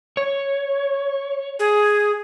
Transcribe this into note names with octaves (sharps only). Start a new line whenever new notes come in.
C#5
G#4